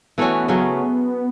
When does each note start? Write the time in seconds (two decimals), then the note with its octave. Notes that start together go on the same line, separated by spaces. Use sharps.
0.18 E3 A3 B3 C#4 F#4
0.48 C#3 F#3 A3 C#4